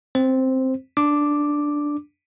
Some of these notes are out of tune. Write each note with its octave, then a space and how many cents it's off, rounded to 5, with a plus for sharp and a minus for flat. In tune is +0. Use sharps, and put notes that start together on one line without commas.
C4 +0 C5 +0
D4 +0 D6 +0